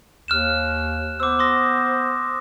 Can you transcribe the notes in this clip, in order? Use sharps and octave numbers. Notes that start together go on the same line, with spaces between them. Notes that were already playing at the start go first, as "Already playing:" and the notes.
D#2 F6 F#6 E7
B3 C5 D6 E6
C6 D#6 A#6